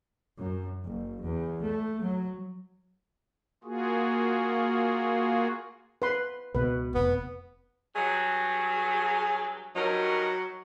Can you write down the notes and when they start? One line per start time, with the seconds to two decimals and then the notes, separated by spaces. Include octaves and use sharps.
0.38 F#2
0.84 F#1
1.21 E2
1.65 A3
2.03 F#3
3.64 A#3 F4 F#4 G#4
6.02 B4 C6
6.55 C#2 B2 B4
6.95 F1 B3
7.96 G2 F#3 G#4
9.76 G2 F#3 D#4 A#4